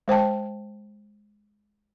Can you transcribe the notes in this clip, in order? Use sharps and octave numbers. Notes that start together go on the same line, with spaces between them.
G#3 C5 G5 A5